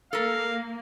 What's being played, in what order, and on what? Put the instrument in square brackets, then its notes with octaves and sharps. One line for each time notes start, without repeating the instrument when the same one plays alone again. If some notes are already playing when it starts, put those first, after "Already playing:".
[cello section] A#3 [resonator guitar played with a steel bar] A4 A#4 [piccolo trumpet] F5